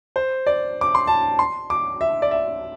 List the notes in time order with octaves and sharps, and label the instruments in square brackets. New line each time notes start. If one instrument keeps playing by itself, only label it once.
[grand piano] C5
D5
D6
C6
A5
C6
D6
E5
D5
E5